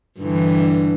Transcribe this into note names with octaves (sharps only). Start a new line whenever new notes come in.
G2 D3 E3